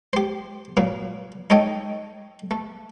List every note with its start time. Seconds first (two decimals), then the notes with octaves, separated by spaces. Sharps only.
0.13 G4 C5
0.77 A#2 F#3 A#3
1.50 D#4 A4 C#5 D#5 G5
2.51 A3